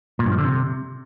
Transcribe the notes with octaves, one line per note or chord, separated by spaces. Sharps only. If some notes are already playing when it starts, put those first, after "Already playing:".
A#2
G2
F3
D3
C3